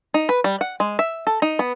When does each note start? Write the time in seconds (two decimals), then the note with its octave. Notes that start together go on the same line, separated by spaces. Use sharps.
0.14 D#4
0.29 B4
0.44 G3
0.61 F#5
0.80 G#3
0.99 E5
1.27 A4
1.42 D#4
1.59 B3